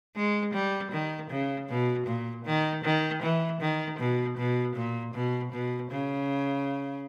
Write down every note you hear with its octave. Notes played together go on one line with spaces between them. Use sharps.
G#3
G3
D#3
C#3
B2
A#2
D#3
D#3
E3
D#3
B2
B2
A#2
B2
B2
C#3